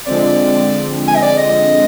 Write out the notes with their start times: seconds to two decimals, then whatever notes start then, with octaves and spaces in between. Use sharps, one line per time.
0.06 D3 F3 G#3 C4 D5
1.08 G#5
1.16 D#5
1.22 D5
1.37 D#5